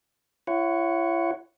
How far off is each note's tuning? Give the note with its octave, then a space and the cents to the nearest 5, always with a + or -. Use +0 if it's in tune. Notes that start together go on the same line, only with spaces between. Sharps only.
E4 +40 C#5 -5 F#5 +0